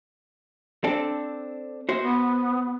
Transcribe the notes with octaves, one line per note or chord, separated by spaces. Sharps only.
C4 D4 A4
F#4 C5 E5
B3